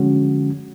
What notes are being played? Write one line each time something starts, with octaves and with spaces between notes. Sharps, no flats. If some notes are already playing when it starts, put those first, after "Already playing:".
Already playing: D3 F3 G#3 C#4 F#4